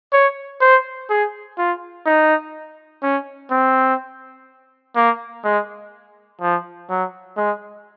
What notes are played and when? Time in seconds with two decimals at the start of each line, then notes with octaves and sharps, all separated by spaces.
0.13 C#5
0.61 C5
1.10 G#4
1.58 F4
2.06 D#4
3.03 C#4
3.51 C4
4.96 A#3
5.44 G#3
6.41 F3
6.90 F#3
7.37 G#3